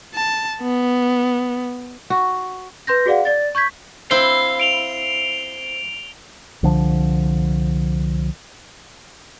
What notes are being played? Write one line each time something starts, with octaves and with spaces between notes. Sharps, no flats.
A5
B3
F#4
B4 C6 G6 A#6
F#4 G#4 D5 F5 F#5
D5 A6
C#6 G6 G#6 B6
C4 E4 F5 G5 G7
D7 F7 G7
C2 D3 F3